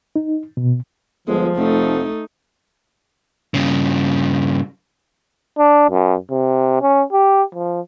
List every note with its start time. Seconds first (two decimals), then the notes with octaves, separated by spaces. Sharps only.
0.16 D#4
0.57 B2
1.27 G1 F3 G#3
1.57 F1 A3 D#4
3.54 G2 C#3
5.58 D4
5.90 F#2
6.31 C3
6.81 C#4
7.13 G4
7.55 F3